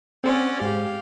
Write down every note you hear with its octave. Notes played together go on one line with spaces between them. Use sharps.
C4 C#4 D5 F#5
G#2 G4 F5